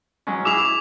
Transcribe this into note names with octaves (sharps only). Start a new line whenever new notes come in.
F#3 G#3 C#4
E4 G#4 D6 E6 F7